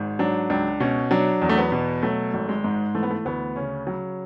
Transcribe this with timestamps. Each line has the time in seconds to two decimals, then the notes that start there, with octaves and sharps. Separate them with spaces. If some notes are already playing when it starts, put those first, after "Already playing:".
Already playing: G#1 G#2
0.19 F#3 D4
0.50 C#2 D4
0.80 B2 C#4
1.11 F#3 D4
1.42 E2
1.49 A3
1.58 B3
1.72 B2
2.03 F#3 A3
2.34 G#1
2.49 G#3
2.64 G#2
2.95 E3 A3
3.03 B3
3.10 A3
3.25 D2 B3
3.56 C#3 C#4
3.87 F#3